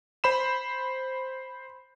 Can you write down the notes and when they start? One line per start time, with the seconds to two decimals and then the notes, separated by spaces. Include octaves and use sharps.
0.24 C5 B5 E7